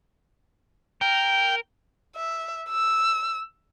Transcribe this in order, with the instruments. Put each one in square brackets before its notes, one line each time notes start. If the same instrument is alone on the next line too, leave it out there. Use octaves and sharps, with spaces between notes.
[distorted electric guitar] A#4 [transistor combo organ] G5
[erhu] E5
E6